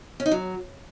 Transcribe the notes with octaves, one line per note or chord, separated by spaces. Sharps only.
C#4
D#4
F#3